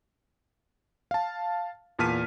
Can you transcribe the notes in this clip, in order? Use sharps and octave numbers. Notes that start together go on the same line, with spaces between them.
F5 A5
E2 A#2 A5 F6 B6 D#7